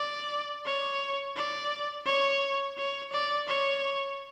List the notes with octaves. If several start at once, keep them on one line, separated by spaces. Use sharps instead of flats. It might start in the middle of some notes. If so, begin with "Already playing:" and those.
Already playing: D5
C#5
D5
C#5
C#5
D5
C#5